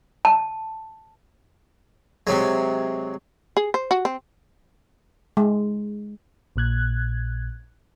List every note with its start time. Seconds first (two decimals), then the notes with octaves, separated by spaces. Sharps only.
0.25 A5
2.27 C3 F#3 G#3
3.57 G#4
3.74 C5
3.91 F#4
4.05 C4
5.37 G#3
6.56 A#1 A#2 F#6 G#6